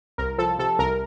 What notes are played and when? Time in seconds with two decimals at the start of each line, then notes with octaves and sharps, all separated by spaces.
0.18 C2 A#4
0.38 F3 A4
0.59 C3 A4
0.79 C2 A#4